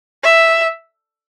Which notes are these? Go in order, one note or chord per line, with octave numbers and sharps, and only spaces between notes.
E5